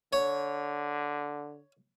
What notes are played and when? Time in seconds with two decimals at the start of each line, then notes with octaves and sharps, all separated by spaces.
0.13 D3 C#5